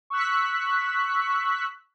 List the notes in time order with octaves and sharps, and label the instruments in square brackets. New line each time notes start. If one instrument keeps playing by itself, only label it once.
[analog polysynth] C#6 E6 F#6 B6